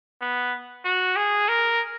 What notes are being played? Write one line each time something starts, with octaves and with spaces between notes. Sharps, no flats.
B3
F#4
G#4
A#4